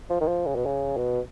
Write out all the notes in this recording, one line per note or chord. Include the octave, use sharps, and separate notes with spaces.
F3
D#3
F3
C#3
B2
C#3
B2